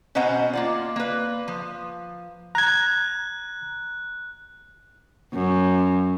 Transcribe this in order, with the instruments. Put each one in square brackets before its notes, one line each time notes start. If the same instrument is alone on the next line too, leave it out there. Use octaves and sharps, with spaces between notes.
[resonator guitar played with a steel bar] B2 C#4 C5 D#5 F#5 A#5
A#3 F4 D5
A#3 B4
F3
[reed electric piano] A#5 G#6 [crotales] F#6
[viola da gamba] F#2